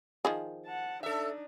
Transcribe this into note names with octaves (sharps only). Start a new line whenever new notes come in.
D#3 F3 G#4
F#5 A5
D4 D#4 A4 E5